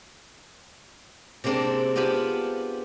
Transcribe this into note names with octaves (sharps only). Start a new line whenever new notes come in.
C3 G#3 A#3 C4 D4 A4
B3 D4 F4 G4 G#5 B5